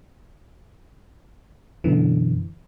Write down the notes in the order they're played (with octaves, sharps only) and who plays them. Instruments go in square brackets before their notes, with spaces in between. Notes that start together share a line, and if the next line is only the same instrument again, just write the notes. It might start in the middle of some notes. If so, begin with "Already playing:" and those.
[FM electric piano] F#2 B2 D3 E3